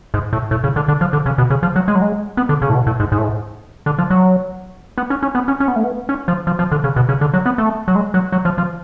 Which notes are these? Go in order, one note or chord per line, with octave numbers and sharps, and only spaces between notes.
G#2
A2
A2
C#3
D3
D3
F3
D3
C#3
B2
C#3
F3
F#3
G#3
F#3
G#3
B3
D3
C#3
A2
B2
A2
G#2
G#2
A2
G#2
D3
F3
F#3
B3
C#4
C#4
B3
C#4
C#4
B3
A3
B3
C#4
F3
F3
F3
D3
C#3
B2
C#3
D3
F#3
B3
A3
F#3
G#3
F#3
F#3
F3
F3